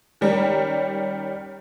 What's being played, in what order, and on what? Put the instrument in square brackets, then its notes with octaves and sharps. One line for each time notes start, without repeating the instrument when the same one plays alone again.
[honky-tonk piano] D#3 G3 C#4 A#4